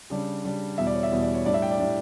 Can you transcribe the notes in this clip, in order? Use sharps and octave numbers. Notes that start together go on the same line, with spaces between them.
C#3 G3 D4
C#3 G3 D4
E2 B2 G3 E5
D5
C#5
E5
E2 B2 G3
D5
C#5
A2 G3 D4 D5
E5
G5
D5
A2 G3 D4